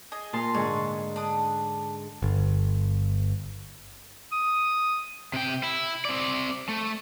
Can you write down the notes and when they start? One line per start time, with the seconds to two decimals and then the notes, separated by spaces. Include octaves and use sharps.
0.12 G#4 D#5
0.33 A#2 A5 C6
0.54 G#2 D3 G#4 C#6
1.16 D4 D#6
2.22 G1
4.32 D#6
5.34 C3 G5
5.63 E4
6.05 C4 D5
6.69 A3